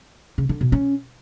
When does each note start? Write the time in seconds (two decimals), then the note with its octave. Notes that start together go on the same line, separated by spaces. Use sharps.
0.38 C#3
0.49 D3
0.61 B2
0.72 C#4